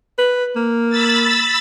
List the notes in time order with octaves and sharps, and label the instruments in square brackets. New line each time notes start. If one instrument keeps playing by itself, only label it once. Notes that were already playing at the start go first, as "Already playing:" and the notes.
[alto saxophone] B4
A#3
[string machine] B5 E6 A6